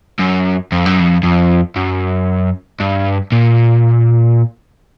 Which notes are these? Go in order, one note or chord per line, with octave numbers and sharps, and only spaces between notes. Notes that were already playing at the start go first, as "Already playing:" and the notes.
F#2
F2
F#2
F2
F2
F#2
G2
A#2